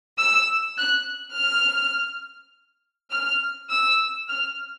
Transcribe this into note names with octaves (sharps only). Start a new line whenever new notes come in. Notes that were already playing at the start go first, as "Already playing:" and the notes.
E6
F#6
F6
F6
E6
F6